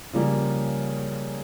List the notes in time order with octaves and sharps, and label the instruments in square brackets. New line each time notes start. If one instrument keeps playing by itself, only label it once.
[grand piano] C#3 F3 G3 A#3